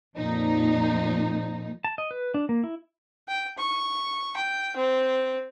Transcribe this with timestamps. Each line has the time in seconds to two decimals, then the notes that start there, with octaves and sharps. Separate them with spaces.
0.17 F2 A#2 F3 D#4
1.84 A5
1.98 D#5
2.11 B4
2.34 D4
2.49 A#3
2.64 E4
3.28 G5
3.58 C#6
4.36 G5
4.76 C4